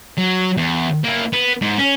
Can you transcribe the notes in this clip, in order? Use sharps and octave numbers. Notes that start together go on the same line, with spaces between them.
F#3
E2
A#3 E4
B3
G#2
C#4